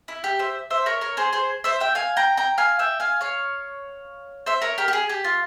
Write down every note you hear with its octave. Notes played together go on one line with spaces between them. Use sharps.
E4
G4
C5 E5
C5 E5
A#4 C#5
A#4 C#5
G#4 C5
G#4 C5
C5 E5
E5 G5
F5 G#5
G5 A#5
G5 A#5
F5 G#5
E5 G5
F5 G#5
C#5 F5
C5 E5
A#4 C#5
G4 A#4
G4
G#4
G4
F4